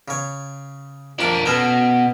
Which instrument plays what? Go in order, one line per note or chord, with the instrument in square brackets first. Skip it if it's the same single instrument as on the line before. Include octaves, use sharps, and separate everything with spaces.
[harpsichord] C#3 C#5
[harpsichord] F2 A5 [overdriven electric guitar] D4 A#4
[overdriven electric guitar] B2 [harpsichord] B3 C#4 A4